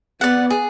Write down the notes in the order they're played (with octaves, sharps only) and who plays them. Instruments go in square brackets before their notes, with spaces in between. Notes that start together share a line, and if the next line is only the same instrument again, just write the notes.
[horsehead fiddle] B3 [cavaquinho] D5 F#5
[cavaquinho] G#4